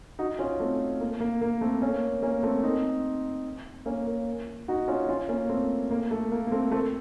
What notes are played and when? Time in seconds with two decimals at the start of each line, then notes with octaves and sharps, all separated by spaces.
0.19 D#4 F#4
0.39 C#4 F4
0.60 A3 C4
1.01 A#3
1.20 A#3
1.41 A#3
1.61 A3 C4
1.82 A#3 C#4
2.23 A#3 C#4
2.43 A3 C4
2.63 C4 D#4
3.86 A#3 C#4
4.07 A#3
4.68 D#4 F#4
4.88 C#4 F4
5.09 C#4 F4
5.29 A#3 C#4
5.49 A3 C4
5.91 A#3
6.11 A3
6.32 A#3
6.47 A#3
6.52 A3 C4
6.71 A3 C4